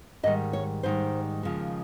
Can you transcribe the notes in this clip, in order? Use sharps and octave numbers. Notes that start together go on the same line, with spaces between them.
G#2 D#3 G3 D#5
C#5
G#2 D#3 G3 C5
D#2 C#3 F3 G#3